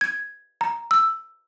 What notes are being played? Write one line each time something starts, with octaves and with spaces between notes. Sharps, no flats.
G#6
A#5
E6